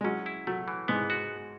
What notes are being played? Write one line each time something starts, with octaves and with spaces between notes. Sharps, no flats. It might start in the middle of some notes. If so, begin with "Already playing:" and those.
G#3
F#3 C#4
E4
F#3 A3
E3
G#2 G#3 B3
F#4